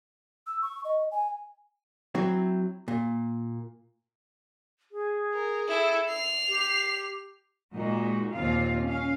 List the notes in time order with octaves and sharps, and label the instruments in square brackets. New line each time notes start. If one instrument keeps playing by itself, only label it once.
[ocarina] E6
C#6
D#5
G#5
[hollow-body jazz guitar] F#3 C4 E4
A#2
[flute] G#4
[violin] A#4
E4 A4
C7 F7
[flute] G4
[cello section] A#2 G#3 D#4 F#4
D#2 A#2 C4 F4 F5
C#4 F5